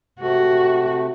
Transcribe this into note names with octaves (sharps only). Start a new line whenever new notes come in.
C3 A3 F#4